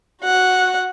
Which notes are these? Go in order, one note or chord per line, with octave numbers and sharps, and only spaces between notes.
F#4 F#5